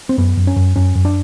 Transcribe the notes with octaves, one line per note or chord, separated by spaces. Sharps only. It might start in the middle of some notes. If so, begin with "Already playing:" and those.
C4
F#2 B3
F#2
C#4
F#2
F#2 C#4
F#2
D4